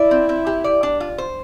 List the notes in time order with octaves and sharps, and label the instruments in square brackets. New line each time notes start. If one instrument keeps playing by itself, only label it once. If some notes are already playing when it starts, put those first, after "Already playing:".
Already playing: [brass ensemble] E4 [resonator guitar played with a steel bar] D5
[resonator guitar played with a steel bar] C4
C4
G4
D5
D4
F4
C5